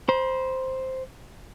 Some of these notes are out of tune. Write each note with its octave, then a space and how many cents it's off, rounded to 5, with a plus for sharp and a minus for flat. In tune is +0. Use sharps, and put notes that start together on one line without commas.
C5 +0 B5 -45